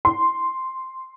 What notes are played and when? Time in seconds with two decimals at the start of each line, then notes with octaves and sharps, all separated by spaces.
0.05 C6